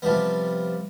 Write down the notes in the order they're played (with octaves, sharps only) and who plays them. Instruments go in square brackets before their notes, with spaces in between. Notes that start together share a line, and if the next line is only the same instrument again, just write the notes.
[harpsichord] C3 F3 G3 B3